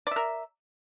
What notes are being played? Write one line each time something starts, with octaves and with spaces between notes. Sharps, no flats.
A#4 D5 E5